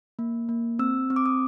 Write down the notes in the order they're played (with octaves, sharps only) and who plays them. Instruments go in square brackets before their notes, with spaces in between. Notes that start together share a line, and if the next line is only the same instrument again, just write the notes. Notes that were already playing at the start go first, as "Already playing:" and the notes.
[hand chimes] A#3
A#3
C4 E6
C4
D6
D#6